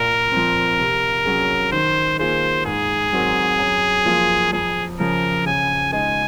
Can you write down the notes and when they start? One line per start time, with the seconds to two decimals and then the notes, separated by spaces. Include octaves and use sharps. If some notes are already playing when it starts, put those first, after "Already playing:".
Already playing: A#2 A#4
0.32 F3 C4
0.79 C3
1.25 F#3 C#4 G#4
1.72 D#3 C5
2.19 A#3 F4 G#4 C5
2.65 G#2 G#4
3.13 F#3 C4 F#4 A#4
3.59 F#2
4.06 F3 A#3 F4
4.53 F2 G#4
4.99 C#3 F3 A#4
5.46 C#3 G#5
5.92 G#3 D#4 G#4 G#5